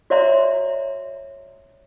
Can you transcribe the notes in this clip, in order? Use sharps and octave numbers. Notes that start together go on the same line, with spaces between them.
F#4 C#5 D5 E5 A#5 C6